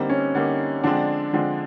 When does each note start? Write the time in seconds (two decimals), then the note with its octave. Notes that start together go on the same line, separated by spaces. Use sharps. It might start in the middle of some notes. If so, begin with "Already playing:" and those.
Already playing: D3 G3 A#3 C4 D#4
0.09 C#4
0.35 D3 G3 A#3 D#4
0.83 D3 F3 G#3 C4 D4
1.33 D3 F3 G#3 C4